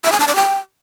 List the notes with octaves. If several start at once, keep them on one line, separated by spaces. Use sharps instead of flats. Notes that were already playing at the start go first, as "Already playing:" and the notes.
E5
G#5
A5
D5
G5